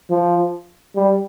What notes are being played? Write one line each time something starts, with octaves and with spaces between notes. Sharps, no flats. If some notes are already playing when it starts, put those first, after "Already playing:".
F3
G3